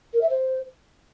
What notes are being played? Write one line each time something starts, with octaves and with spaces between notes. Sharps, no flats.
A#4
E5
C5